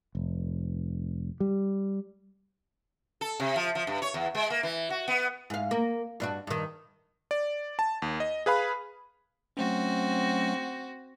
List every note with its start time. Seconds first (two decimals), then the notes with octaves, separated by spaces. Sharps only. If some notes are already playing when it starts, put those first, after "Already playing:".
0.15 F1
1.40 G3
3.21 A4
3.40 C3
3.56 F3
3.75 F3
3.87 G2
4.02 C#5
4.14 E2
4.35 G#3
4.50 A#3
4.63 E3
4.90 F#4
5.08 B3
5.50 G#2 F5
5.71 A#3
6.20 G2 D4 F#4
6.47 G2 D#3
7.31 D5
7.79 A5
8.02 D#2
8.20 D#5
8.46 G#4 B4 F5 B5
9.57 F#3 A3 C4 C#4 F#4